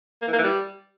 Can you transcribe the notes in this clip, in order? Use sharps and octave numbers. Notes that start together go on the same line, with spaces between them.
A#3
E3
A#3
E3
G3